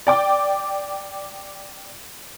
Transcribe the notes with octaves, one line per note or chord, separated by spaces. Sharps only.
D5 G5 D6